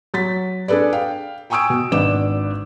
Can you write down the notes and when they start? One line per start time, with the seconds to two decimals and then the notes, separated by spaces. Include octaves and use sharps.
0.14 F#3 A6 B6
0.68 D4 G#4 A4 B4 D5
0.93 F5 G5
1.50 G5 G#5 C#6 D#6 E6 D7
1.70 B2
1.92 G#1 D4 B4 D#5 D6 E7